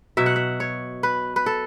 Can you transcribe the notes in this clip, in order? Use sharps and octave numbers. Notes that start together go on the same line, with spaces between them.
B2 F#3 E5
F#5
E5
C#5
B4
B4
A4